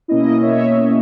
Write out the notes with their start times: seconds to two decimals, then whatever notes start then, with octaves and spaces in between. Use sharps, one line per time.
0.08 B2 A#3 C#4 E4 D#5
0.42 C#5 E5